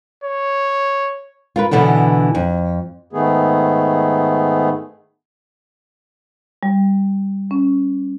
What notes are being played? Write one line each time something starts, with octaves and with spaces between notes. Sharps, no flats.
C#5
F4 A#4 B4
B2 D3 E3 B3 D4
F2
G#2 D#3 A3 B3 G#4
G3
C#4